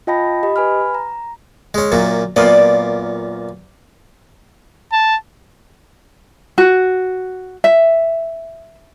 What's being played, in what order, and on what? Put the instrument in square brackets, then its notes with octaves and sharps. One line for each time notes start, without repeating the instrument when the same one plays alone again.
[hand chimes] F4 D#5 G5 A5 B5 A#6
G4 D#5 B5
B4 G#5 B5 F6
A#5
[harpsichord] G#3 C#4
F#2 A#2 F#3
[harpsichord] F#2 A#2 B3 [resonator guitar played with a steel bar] F4 D5
[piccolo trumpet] A5
[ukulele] F#4
E5